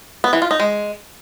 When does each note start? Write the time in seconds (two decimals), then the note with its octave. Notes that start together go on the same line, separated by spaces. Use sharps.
0.24 B3
0.33 E3
0.42 F4
0.51 D#4
0.60 G#3